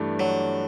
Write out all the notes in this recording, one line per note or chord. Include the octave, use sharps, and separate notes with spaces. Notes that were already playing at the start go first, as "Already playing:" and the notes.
Already playing: G2 E3 A3 D4
F#3